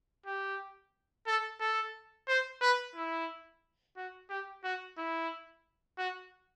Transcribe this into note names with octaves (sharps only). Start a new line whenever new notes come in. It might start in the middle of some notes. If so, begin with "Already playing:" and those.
G4
A4
A4
C5
B4
E4
F#4
G4
F#4
E4
F#4